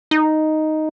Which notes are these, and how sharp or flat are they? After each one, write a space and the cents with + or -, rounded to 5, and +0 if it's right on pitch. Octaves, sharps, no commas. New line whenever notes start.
D#4 +0